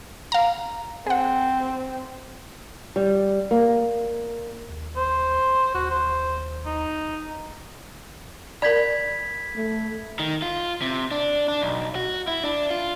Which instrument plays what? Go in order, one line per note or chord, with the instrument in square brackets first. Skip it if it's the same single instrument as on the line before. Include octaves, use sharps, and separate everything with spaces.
[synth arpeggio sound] F5 A#5
[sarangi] C4 [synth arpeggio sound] G#4 F#5
[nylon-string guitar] G3
A#3
[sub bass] D#2
[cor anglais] C5
[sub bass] D#2 [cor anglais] F#4
[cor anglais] C5
D#4
[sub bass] D1
[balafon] A#4 D5 [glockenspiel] B5 G#6 B6
[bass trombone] A3
[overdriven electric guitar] D#3
F4
C3
D4
D4
B1
F#4
E4
D4
F4